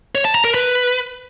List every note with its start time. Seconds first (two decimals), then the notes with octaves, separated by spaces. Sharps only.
0.15 C#5
0.25 A5
0.35 A#5
0.45 A#4
0.54 B4